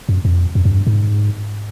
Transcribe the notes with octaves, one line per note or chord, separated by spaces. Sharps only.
F#2
F2
F#2
F#2
G2
G#2